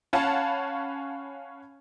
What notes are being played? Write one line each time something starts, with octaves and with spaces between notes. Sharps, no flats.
C#4 C#5 F5 F#5 A5 B5